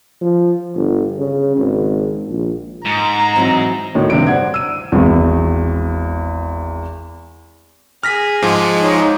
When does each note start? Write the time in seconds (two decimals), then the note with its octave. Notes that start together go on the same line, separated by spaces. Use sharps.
0.21 F3
0.75 G1
1.18 C#3
1.57 G#1
2.29 A#1
2.85 G#2 A#5
3.36 E3 F#3 C4
3.95 D2 A2 D#3 C#5
4.10 G2 C3 D4 D7
4.27 C5 D5 F#5 G#6
4.54 E6 D#7
4.92 G#1 E2
8.03 G#4 F6 A#6 B6
8.43 G#2 F3 G#3
8.81 D#4 C#5